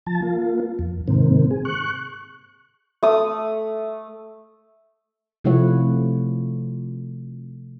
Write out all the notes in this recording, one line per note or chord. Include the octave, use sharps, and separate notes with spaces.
F3 A5
A#3 F4
F2
G#2 C3 D#3 A#3 C4
G#4
C#6 F#6
A3 D#6
C3 F3 A3 E4 C#5 F#5